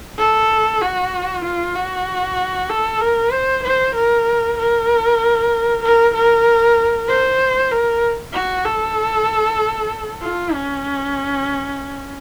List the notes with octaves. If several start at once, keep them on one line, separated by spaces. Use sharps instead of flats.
A4
F#4
F4
F#4
A4
A#4
C5
C5
A#4
A#4
A#4
A#4
C5
A#4
F#4
A4
F4
C#4